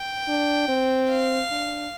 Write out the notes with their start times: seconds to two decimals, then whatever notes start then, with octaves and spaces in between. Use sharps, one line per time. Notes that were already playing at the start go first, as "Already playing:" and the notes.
Already playing: G5
0.28 D4
0.68 C4
1.10 F5
1.51 D4